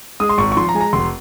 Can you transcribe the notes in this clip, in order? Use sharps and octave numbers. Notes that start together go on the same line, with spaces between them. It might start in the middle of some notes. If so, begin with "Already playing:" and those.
G#3 D#6
C6
G#1 C#6
C#6
F3 C6
A#5
G#3 G#5
A#5
F1 C6